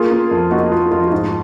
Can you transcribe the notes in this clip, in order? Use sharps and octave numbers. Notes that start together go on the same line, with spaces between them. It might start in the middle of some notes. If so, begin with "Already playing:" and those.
Already playing: A#3 F4 G#4
A#3
F2
A#3 D#4 F#4
A#3 F4
F2 F4
D#4
G#2 F4